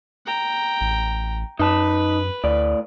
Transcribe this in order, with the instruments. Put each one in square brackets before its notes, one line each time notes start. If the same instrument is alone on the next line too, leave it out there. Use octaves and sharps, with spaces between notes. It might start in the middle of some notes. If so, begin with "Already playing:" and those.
[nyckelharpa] G5 A#5
[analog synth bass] A1
[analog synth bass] F#2 [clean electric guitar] D#4 A5 [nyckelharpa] B4 B5
[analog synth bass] D2 [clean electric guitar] A2 D5